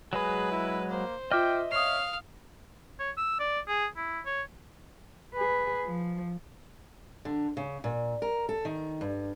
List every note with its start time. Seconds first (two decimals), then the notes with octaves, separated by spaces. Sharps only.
0.13 F#3 G#3 G#4 B4 B5
0.52 E4
0.90 A#3 C5
1.31 F4 D#5 E5 G5 D6 F6
1.72 C#5 F5 D#6 F6 C7
2.99 C#5
3.17 E6
3.40 D5
3.68 G#4
3.97 E4
4.26 C#5
5.34 G#4 B4
5.86 F3
7.25 D3
7.57 C#3
7.84 A#2
8.22 A#4
8.49 A4
8.65 D#3
9.01 G2